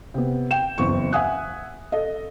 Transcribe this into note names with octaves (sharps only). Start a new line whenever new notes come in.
C3 B3
G5 E7
F#1 E2 C4 C#6
E5 F#5 G#5 D#6 F#6
A4 D#5